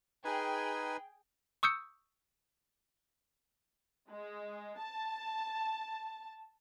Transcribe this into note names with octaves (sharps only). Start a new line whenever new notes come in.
D#4 G#4 B4 G5 G#5
C#6 D#6 E6 G6 C#7
G#3
A5